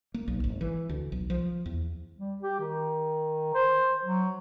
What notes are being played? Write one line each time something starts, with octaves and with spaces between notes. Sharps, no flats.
A#3
B1
G#1
E3
D2
B1
F3
E2
G3
G4
D#3
C5
F#3